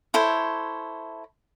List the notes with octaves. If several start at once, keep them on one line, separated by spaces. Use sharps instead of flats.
E4 A4 C5 C#5